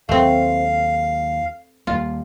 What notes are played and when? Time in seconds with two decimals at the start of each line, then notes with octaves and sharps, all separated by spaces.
0.09 D#2 F#3 A3 C4 F5
1.87 D#2 G3 A#3 F4